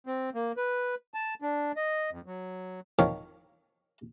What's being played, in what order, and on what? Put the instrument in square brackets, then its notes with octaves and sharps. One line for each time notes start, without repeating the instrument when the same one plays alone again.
[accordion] C4
A#3
B4
A5
D4
D#5
F2
F#3
[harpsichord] D#3 F3 A#4 C#5